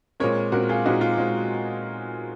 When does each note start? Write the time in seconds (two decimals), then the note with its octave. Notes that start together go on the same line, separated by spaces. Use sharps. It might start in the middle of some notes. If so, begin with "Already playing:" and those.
0.20 A#2 G#3 C4 A#4 C#5
0.52 A#2 G#3 C4 F#4 A#4
0.69 F4 G#4
0.85 A#2 G#3 C4 D#4 F#4
1.01 F4
1.18 A#2 G#3 C4